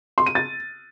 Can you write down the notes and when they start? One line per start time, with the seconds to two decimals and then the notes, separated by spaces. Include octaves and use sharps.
0.18 C6
0.26 D#7
0.35 A6